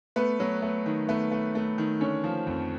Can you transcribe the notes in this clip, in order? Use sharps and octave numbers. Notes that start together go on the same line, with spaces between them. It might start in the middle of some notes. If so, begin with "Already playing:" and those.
A3 B3 B4
F#3
A3
D#3
A3 B3 B4
A3
A3
D#3
D3 C#4 C#5
F3
F2